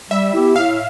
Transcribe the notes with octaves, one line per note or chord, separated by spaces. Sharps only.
G3 E5
B3 E4 G4
A2 F5